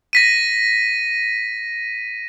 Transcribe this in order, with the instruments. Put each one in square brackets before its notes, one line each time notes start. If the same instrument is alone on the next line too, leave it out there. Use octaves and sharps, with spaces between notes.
[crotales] A#6 B6 D#7